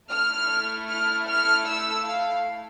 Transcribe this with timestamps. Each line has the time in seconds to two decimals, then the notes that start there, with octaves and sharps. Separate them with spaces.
0.10 A3 E4 A4 F6
0.89 F6
1.28 F6
1.66 E6
2.06 F5